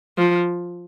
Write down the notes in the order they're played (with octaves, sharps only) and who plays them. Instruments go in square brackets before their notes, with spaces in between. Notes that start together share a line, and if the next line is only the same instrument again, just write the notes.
[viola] F3